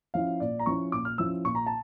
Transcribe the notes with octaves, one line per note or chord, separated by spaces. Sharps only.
F3 C#4 E4 F5
A#2 D5
A#5
F3 C#4 E4 C#6
A#2 D6
F6
F3 C#4 E4 E6
A#2 C#6
A#5
A5